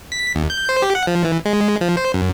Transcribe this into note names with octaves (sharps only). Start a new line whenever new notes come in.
B6
D#2
G6
C5
G4
F#5
F3
E3
G#3
F3
C5
F#2